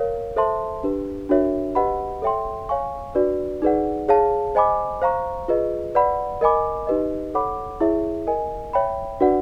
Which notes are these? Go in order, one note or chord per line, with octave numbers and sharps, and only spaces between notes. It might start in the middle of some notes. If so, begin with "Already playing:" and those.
Already playing: A#4 C#5 F5
A4 C5 E5 A5 C6
D4 G4 B4
D4 F#4 A#4 C#5 E5
G4 B4 D#5 F#5 B5
A4 C#5 E5 G5 C6
C#5 F5 G#5 C#6
D4 F#4 B4 D5
D#4 G#4 B4 D5 F#5
G#4 C#5 F5 A5
C5 D#5 G#5 B5 D6
C5 F5 A#5 C#6
F4 G#4 B4 D#5
B4 D5 F#5 B5
A#4 D#5 G#5 B5 D6
D#4 G4 B4 D#5
A4 C#5 F#5 B5 D6
E4 G#4 C#5 E5
A#4 D#5 G#5
C#5 E5 G5 B5
D4 F#4 B4 D5 F#5